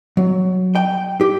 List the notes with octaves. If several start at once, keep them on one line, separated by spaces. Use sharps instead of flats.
F#3
G5
G4